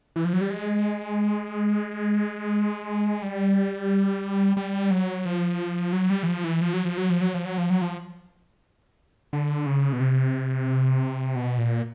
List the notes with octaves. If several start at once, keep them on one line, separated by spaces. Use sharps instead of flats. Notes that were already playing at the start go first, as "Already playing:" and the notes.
E3
F3
F#3
G3
G#3
G3
G3
F#3
F3
F#3
G3
E3
F3
E3
F3
F#3
F3
F#3
F3
F#3
F3
F#3
F3
F#3
F3
D3
C#3
B2
C3
B2
A#2